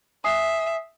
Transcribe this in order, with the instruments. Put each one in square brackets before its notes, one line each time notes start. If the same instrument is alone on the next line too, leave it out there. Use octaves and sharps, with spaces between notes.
[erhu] E5 [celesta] G#5 D#6 C7